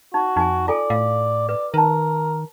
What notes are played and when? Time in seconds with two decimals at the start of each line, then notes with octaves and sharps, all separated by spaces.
0.14 D#4 F#4
0.36 F2 D#4 G#5
0.68 F4 A4 D5 G#5
0.90 A2 F5
1.49 B4 D5
1.74 D#3 A#4 B4 A5